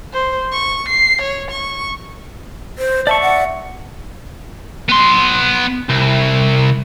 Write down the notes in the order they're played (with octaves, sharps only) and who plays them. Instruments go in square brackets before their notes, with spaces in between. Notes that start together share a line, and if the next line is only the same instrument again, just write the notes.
[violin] C5
C#6
C7
C#5
C#6
[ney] C5
[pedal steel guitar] D5 E5 C#6 [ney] A5
[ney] F#5
[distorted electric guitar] B3 C6
C2